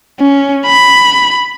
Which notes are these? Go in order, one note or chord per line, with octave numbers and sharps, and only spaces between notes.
C#4
B5